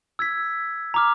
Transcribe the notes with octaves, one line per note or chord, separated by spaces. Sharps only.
E6 G#6 B6
A#5 D6 F6